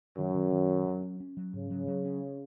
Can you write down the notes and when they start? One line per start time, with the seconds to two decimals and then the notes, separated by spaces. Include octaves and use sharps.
0.17 F#2 D#3
0.34 D#3
0.52 D#3
0.69 C#4
0.86 F#3
1.03 C#4
1.20 C#4
1.37 F#3
1.53 G#2 C#3
1.70 F#3
1.87 F#3
2.05 C#4